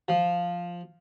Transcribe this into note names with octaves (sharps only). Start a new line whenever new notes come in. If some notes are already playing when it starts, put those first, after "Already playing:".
F3